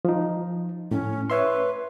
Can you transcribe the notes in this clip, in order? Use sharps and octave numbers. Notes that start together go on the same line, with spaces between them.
F3 D#4
A2 C#4
B4 C#5 E5 C6